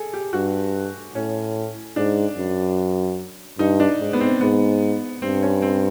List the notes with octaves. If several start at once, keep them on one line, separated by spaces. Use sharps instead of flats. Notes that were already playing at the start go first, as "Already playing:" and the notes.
Already playing: G#4 A4
G4
G2 F#4
A2 C#4
G#2 D4
F#2
G2 D#4
D4
G#2
B3
C4
G#2 B3
G2 C4
C#4
C4